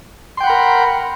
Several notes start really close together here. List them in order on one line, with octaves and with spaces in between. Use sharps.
C6 G5 F#5 B5 A#4